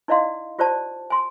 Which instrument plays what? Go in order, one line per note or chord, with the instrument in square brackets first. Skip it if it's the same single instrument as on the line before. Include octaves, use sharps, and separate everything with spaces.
[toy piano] D#4 E4 D5 D#5 F5 C6
F4 G4 C5 D5 A5
G#5 C6